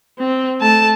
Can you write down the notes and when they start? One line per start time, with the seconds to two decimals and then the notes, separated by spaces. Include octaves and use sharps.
0.19 C4
0.61 A3 A5